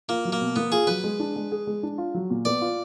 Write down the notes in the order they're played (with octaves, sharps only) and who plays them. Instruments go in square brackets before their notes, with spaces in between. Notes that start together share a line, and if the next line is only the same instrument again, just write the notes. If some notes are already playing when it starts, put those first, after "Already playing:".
[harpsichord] A#3 [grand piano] F4
[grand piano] F#3
[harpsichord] A#3
[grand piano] B2
[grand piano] A#3 [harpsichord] B3
[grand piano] F4 [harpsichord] G#4
[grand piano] F#3 [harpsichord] B4
[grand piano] G#3
D4
G#3
G#4
G#3
D4
F4
F#3
A#2
[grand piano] B3 [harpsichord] D5
[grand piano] F4